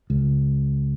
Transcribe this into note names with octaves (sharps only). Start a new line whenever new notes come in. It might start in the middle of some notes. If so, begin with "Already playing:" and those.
C#2